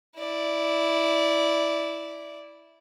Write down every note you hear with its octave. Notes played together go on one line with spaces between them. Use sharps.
E4 D5